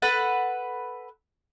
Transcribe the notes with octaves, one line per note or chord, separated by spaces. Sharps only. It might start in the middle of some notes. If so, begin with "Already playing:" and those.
A4 B4 F#5